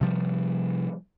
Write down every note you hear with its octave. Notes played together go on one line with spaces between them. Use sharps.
C3 F3 G3